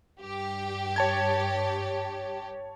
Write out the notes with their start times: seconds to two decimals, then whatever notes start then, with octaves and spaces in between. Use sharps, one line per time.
0.20 G2 G4
0.96 C#5 A5 G#6